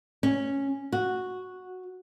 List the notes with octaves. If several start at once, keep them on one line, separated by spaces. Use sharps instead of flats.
C#4
F#4